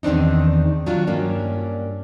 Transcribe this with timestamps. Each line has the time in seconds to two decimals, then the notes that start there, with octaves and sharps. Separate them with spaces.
0.03 E2 D#3 C4 D4 D#4
0.86 D#3 F#3 D4 D#4 F4
1.07 G2 A#3 C#4 D4